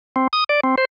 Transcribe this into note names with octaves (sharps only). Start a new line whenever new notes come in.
C4
D#6
D5
C4
C5